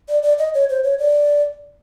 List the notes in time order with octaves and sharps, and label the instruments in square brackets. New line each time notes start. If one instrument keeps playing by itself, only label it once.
[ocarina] D5
D5
D#5
C#5
C5
C#5
D5